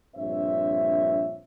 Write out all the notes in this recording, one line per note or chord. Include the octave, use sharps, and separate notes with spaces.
A#1 G2 C4 C#5 E5